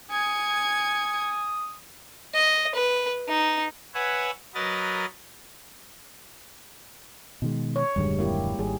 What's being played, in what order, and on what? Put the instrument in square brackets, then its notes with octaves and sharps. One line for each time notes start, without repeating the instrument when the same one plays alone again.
[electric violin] G#5 [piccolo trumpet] D#6 [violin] G#6 C#7
[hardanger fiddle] D#5
B4
D#4
[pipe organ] B4 C#5 E5 F#5 G#5
F#3 A#4 B4 D#5 A6
[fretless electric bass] B2 D#3 G#3
[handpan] C#5
[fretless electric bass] D#1 F#2 D3 [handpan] G3 G#3
[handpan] A#3 E4 G4
[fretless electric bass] G#1 [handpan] D#3 G3 G#4